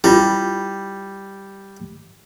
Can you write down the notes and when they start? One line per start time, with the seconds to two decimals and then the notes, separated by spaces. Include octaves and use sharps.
0.04 G3 E4 F4